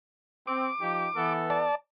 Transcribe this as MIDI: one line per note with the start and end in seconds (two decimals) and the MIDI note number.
0.47 0.69 60
0.47 1.33 86
0.82 1.08 53
0.82 1.08 63
0.82 1.08 67
1.16 1.69 52
1.16 1.69 59
1.16 1.69 69
1.50 1.75 74
1.50 1.75 81